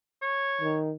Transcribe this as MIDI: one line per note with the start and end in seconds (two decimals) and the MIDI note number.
0.22 0.77 73
0.61 0.94 51